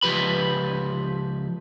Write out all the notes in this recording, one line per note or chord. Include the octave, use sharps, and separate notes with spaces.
C#2 F3 G4 B4 B5